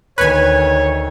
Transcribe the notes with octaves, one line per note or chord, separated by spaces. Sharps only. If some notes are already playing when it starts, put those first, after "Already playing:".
D2 D#3 B4 C#5 G#5